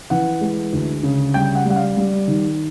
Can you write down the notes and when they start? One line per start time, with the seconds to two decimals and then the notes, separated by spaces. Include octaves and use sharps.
0.10 E3 F#5
0.41 G#3
0.73 D2
1.03 C#3
1.34 G3 G5
1.55 F#5
1.65 G3
1.70 F#5
1.76 F5
1.97 G3
2.28 D#3